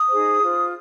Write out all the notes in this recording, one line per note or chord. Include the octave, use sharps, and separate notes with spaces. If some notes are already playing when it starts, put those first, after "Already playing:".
Already playing: D#6
D#4 G#4 C5
F4 C5